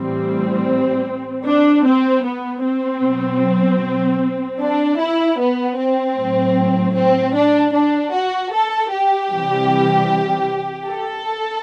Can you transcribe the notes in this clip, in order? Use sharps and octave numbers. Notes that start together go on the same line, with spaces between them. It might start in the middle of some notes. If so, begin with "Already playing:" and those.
Already playing: A2 E3 G3 C4
D4
C4
B3
C4
B2 F#3
D4
E4
B3
C4
A2 F#3
C4
D4
D4
F#4
A4
G4
C3 E3 G3
A4